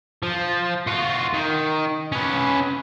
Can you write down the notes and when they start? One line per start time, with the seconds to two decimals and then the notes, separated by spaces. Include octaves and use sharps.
0.23 F3
0.87 F4 F#4
1.34 D#3
2.12 C#4 B4